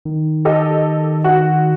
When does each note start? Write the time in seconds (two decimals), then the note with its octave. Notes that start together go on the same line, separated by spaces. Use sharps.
0.05 D#3
0.45 G4 A4 D#5
1.24 F#4